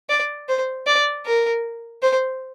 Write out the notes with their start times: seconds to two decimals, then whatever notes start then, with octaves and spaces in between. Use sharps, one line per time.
0.09 D5
0.48 C5
0.87 D5
1.25 A#4
2.03 C5